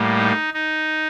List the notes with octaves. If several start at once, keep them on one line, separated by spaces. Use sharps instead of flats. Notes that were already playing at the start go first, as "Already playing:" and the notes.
Already playing: A2 G3 A#3
D#4
D#4